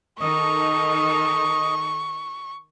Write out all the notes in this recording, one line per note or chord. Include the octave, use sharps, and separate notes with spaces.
D#3 D#4 A4 D#5 C#6